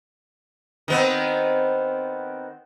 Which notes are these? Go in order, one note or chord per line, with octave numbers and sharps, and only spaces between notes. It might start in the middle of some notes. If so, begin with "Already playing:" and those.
D#3 B3 C4